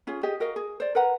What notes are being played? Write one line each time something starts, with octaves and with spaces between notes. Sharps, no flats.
C#4 F4 G#4
G4 G#4 D#5
F#4 A#4 D#5 F5
G#4
C5 D5
A#4 B4 F#5 A#5